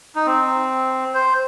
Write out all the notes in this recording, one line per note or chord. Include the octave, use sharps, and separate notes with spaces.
D#4
C4
C5